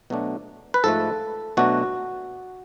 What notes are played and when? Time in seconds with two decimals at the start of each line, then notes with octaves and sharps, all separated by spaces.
0.10 B2 F#3 A3 D4
0.74 B4
0.84 G#2 F3 A3 A4
1.57 B2 F#3 A3 D4 F#4